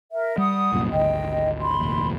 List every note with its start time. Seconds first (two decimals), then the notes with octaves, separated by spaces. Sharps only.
0.11 A#4 E5
0.38 G3 F#5 D#6
0.72 C2 F#2 A#2
0.92 G#1 D2 D#5 G5
1.61 B5 C6
1.79 F1 A#1 D#2